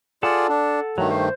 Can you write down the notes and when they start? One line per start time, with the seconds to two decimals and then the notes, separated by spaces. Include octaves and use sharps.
0.23 F4 G#4 A4 D5 F#5 A5
0.49 D4
0.98 G2 D#3 F#3 A3
1.11 C5